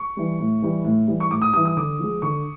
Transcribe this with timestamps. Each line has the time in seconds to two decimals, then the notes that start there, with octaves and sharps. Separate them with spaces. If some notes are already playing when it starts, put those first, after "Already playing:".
Already playing: C#6
0.17 E3 G3
0.40 A2
0.62 E3 G3
0.84 A2
1.07 E3 G3
1.20 C#6
1.30 A2 D6
1.42 D#6
1.53 E3 G3 D#6
1.65 D#6
1.77 D3 D6
1.99 F3 G#3
2.22 D3 C#6